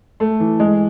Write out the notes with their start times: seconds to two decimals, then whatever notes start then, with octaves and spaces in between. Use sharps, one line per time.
0.20 A3
0.40 E3
0.60 G#3